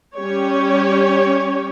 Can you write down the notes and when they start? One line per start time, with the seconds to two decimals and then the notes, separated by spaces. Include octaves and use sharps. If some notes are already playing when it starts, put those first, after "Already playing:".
0.16 G3 C#4 G4 C#5